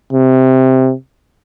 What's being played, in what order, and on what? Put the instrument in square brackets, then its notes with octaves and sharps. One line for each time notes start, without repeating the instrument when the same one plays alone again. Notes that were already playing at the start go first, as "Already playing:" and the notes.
[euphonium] C3